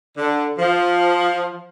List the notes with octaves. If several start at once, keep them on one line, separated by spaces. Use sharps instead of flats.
D3
F3